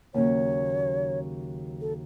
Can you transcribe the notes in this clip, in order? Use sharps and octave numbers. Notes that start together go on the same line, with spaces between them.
D#2 C#3 F#3 C#5
A4